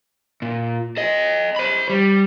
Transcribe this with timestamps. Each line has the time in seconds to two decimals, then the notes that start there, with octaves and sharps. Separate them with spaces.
0.42 A#2
0.97 A4 D#5
1.56 C5 B5
1.89 G3